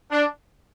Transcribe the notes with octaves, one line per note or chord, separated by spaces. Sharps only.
D4